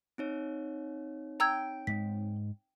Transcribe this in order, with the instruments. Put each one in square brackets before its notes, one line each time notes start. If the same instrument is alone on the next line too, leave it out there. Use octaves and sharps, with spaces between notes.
[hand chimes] C4 D#4 C#5
[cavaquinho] G5 [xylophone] A#5 E6 G#6
[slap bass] G#2 G#3 [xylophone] B6